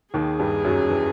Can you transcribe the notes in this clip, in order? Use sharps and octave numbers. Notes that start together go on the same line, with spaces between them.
D#2 D#3 G#4
G2 G3
F#2 F#3
E3